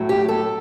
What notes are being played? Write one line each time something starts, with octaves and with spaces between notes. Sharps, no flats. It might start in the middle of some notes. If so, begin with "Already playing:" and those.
Already playing: A2 F#3
G4
A4